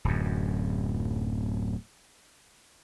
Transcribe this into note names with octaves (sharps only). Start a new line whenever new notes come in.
D1 F#2